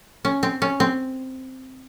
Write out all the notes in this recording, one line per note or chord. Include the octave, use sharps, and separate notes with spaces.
C#4
C4
C#4
C4